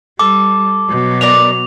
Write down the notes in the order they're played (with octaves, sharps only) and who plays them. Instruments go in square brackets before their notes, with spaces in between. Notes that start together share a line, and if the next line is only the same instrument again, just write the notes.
[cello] G3 [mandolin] A4 [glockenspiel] D6
[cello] B2 F#3
[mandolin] D4 A#4 D5 [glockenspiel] F7